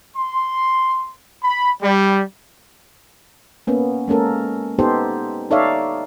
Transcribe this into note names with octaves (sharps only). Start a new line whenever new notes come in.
C6
B5
G3
A#3 B3 C#4
G#3 A#3 C#4 A4 A#4
B3 D#4 G4 A4 C5
D#4 A4 C#5 D5 E5 F5